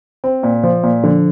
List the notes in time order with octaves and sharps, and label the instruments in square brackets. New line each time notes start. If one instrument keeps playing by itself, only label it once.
[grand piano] C4
A#2
F3
A#2
[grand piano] D3 [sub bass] F3